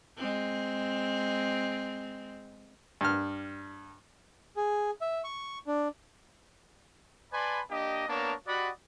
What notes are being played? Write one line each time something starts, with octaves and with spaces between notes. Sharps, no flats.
G#3 C4
G2 F6
G#4
E5
C#6
D4
B4 D5 G#5 A5 B5 C6
A#3 D4 G4 D#5
A#3 B3 D4 A#4 C#5 A5
F#4 G4 D5 D#5 F#5 B5